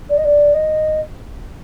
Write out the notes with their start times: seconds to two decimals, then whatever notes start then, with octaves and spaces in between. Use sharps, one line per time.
0.09 D5
0.17 D#5
0.24 D5
0.54 D#5